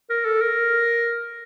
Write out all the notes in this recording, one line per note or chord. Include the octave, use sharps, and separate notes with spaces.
A#4
A4
A#4